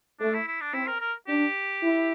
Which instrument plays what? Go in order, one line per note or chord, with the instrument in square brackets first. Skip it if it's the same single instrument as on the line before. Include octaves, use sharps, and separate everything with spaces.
[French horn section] A3 [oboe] D4
[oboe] E4
E4
D4
[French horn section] C4 [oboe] E4
[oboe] A#4
A#4
[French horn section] D4 [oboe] G4
[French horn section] E4